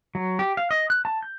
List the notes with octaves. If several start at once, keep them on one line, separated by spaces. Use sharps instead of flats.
F#3
G4
F5
D#5
F#6
A5
G6